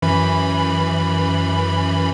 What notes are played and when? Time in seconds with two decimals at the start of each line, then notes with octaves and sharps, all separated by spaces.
0.02 F#2 E3 B5